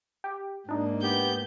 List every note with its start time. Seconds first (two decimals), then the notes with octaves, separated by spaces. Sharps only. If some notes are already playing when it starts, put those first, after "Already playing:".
0.24 G4
0.69 G#2 A#3 D4 D#4
1.02 B3 G4 G6